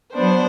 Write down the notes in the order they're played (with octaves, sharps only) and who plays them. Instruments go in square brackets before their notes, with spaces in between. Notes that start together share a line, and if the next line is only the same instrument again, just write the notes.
[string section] F#3 B3 D4 C5